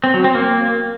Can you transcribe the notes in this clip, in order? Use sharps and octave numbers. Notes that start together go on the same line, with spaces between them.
C4
F#3
C4
A#3